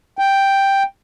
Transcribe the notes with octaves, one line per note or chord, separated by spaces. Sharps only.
G5